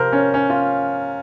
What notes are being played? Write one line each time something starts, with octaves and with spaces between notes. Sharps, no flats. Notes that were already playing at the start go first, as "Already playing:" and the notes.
Already playing: C3 F3 A#4 C5
C#4
C#4
F4